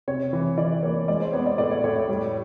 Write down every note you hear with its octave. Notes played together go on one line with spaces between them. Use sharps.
C3 C#5
E3
E3 D5
A#3 C#5
G#3 D5
C5
B3 C#5
D5
A2 D5
C#5
A2 C#5
C#5
G3